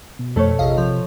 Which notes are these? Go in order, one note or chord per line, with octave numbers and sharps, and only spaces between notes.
B2
F2 A3 A4 C#5
A#1 C3 D#5 F5
F3